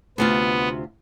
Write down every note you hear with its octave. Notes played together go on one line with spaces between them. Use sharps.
D2 C3 B3 F4